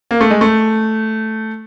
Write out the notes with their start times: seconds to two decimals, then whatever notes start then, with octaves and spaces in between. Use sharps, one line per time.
0.11 A#3
0.21 A3
0.30 G#3
0.41 A3